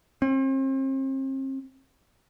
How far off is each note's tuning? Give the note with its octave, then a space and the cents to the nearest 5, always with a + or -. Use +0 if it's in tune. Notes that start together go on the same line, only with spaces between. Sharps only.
C4 +40